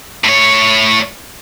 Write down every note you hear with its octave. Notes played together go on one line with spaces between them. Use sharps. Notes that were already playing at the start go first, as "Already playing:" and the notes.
A2 C#5